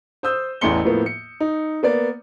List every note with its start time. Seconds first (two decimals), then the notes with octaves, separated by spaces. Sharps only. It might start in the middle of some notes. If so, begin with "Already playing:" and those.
0.23 C5 D#6 E6 G6
0.61 A1 E2 A3 C6 C#7 G7
0.85 A2 F3 A#3 B3
1.06 C#7
1.40 D#4
1.83 A#3 B3 D5